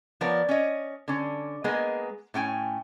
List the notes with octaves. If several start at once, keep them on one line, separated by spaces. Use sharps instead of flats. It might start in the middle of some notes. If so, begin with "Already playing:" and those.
F3 B3 A#4 C#5 D5
C#4 C#5 D#5
D3 C#4
G#3 A#3 B3 G#4 A#4 D#5
A2 C#4 G5 G#5